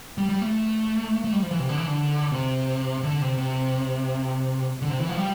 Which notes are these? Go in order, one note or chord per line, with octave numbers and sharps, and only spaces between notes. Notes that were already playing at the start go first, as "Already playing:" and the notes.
G3
G3
A3
A3
G3
F3
E3
C3
D3
E3
D3
C3
D3
C3
C3
D3
C3
E3
F3
G3